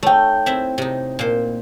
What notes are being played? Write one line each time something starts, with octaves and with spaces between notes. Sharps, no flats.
A3 D#4 C#5 G5
C4 E4 E5
C3 D#4
A#2 C5